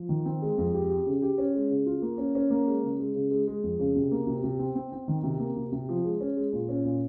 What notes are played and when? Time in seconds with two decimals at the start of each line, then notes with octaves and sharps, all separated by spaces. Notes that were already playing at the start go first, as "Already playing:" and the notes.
Already playing: F3
0.09 D#3
0.25 C4
0.42 G#3
0.58 F2
0.74 G4
0.90 G4
1.06 C#3
1.22 G4
1.38 C#4
1.54 G#3
1.70 C#3
1.86 F4
2.02 A#3
2.18 C#4
2.35 C#4
2.50 A#3
2.67 G#3
2.83 C#3
2.99 G#3
3.15 C#3
3.31 G#3
3.47 G#3
3.63 F2
3.79 C#3
3.96 C3
4.11 A#3
4.27 C3
4.44 C3
4.59 C4
4.76 C4
4.92 C4
5.08 D#3
5.23 C3
5.39 A#3
5.56 C3
5.72 C3
5.89 F3
6.04 G#3
6.20 C#4
6.37 G#3
6.53 A#2
6.69 C#4
6.85 A#2